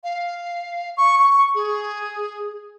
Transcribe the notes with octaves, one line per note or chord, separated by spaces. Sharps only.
F5
C#6
C#6
G#4